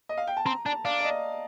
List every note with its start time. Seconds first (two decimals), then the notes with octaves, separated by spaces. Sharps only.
0.09 D#5
0.18 F5
0.27 G5
0.37 A5
0.46 C4 A#5
0.66 D4 A5
0.85 D4 F5
1.01 D5
1.05 D#5